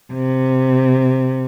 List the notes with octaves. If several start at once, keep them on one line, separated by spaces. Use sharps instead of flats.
C3